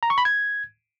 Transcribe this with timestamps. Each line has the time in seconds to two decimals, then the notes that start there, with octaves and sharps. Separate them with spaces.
0.03 A#5
0.10 C#6
0.18 B5
0.25 G#6